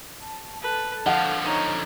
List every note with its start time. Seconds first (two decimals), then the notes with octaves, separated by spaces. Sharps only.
0.21 A5
0.62 A4 B4 A5
1.06 D3 F3 F5 F#5
1.44 D#4 C#5